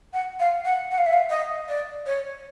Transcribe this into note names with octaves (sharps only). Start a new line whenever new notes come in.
F#5
F5
F#5
F#5
F5
E5
F5
D#5
D5
C#5